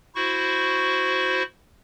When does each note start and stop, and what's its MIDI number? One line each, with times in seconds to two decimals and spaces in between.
0.15 1.43 64
0.15 1.43 66
0.15 1.43 72
0.15 1.43 85